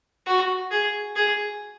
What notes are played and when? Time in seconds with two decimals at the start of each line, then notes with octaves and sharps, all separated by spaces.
0.26 F#4
0.71 G#4
1.15 G#4